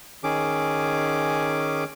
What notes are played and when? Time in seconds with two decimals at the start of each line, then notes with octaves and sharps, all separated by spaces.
0.24 D#3 C#4 G#4 D6